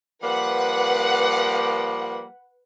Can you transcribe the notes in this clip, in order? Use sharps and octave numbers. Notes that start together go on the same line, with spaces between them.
F3 G3 A#3 B4 F#5